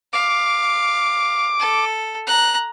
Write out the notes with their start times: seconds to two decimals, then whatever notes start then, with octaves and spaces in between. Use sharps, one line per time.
0.13 F5 D6
1.60 A4
2.27 A#5 F#6